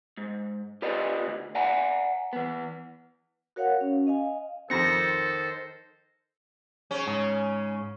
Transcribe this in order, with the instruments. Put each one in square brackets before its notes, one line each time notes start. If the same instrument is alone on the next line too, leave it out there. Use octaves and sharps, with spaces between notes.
[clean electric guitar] G#2
F4 G4 B4 D5 D#5
D2
D5 F#5 G#5 A#5
E3 B3
[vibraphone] F#4 A#4 C#5 F5 F#5
C#4
D#5 F5 G#5
[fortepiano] F2 C4 [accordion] D#3 C5 [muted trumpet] A4 [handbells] A#6 C#7
[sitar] C#3 C#4
[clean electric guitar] G#2